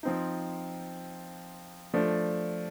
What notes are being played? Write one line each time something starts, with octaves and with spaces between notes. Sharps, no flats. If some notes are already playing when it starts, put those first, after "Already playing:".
F3 C4 D#4
F3 A3 D4